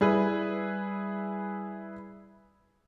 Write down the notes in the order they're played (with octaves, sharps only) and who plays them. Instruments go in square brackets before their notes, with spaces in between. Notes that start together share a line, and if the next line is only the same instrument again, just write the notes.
[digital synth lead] G3 [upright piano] E4 G#4 B4